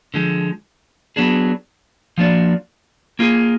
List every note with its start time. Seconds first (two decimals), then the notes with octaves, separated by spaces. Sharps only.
0.14 D3 F3 G#3
1.16 F#3 B3 D4 G#4
2.18 F3 A#3 D4 F#4 D5
3.19 A#3 F4 G#4